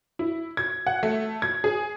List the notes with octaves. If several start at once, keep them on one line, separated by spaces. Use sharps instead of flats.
E4
G#6
F#5
A3
G#6
G#4